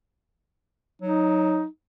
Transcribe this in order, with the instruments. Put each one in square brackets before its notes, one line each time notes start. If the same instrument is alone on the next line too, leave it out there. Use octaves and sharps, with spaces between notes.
[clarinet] F#3 [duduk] D#4